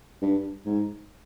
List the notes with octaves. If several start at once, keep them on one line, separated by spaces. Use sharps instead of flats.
G2
G#2